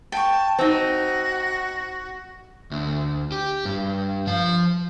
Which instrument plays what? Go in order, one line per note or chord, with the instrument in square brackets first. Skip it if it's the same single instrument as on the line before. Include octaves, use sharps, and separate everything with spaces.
[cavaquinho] G5 C#6 [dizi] A5
[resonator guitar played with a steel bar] C4 D#4 [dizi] F#4
[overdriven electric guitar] D2
G4
G2
F3 F5